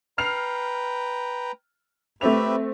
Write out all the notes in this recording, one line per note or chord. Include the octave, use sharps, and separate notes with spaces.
B4 G5 A#5 F6 C7 F7
A3 C4 G4 B4 E5 F7